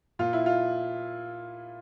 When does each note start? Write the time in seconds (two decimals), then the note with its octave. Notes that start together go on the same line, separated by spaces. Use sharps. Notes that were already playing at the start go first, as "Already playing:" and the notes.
0.19 A#2 F4
0.33 E4
0.46 F4